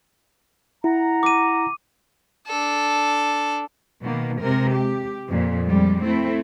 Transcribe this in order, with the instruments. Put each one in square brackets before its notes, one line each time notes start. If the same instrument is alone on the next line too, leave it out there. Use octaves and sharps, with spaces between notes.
[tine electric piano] E4 [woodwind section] F#5 A#5
[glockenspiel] D6 D#7
[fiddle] D4 A4
[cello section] B2 D#3 A#3
C3 G#3 A#4
G4
F2 A#2
F2 G3 G#3
A3 C4 E4